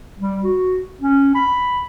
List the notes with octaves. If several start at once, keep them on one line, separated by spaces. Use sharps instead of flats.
G3
F#4
C#4
B5